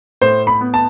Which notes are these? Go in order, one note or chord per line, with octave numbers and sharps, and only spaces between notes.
A2 C5
B5
B3
A5